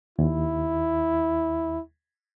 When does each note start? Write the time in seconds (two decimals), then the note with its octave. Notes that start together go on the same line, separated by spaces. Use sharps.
0.19 D#2 E4